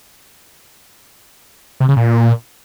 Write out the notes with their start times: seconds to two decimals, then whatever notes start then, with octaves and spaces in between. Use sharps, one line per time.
1.80 C3
1.89 C#3
1.97 A#2